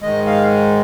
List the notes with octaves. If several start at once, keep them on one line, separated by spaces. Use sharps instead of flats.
G#2 D#3 G#3 D#5
F5